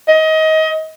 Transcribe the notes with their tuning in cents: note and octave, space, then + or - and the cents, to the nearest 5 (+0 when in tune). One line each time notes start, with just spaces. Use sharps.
D#5 +25